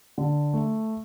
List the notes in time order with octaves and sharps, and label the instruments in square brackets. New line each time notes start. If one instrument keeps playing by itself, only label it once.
[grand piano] D3
A3